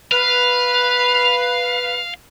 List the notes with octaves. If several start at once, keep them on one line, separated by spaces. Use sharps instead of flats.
B4 F5